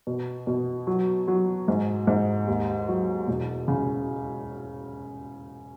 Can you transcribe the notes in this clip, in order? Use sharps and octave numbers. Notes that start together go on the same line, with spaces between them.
B2
B2
F#3
F#3
G#2
G#2
D#2
F#3
E1
C#3